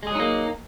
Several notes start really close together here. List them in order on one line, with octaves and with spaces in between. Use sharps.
G#3 G#4 F#3 D#4 A#3